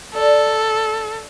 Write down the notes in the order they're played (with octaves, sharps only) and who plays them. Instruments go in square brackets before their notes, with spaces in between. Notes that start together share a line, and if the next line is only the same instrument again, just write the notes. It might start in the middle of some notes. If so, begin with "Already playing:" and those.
[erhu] A4 [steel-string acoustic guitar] D5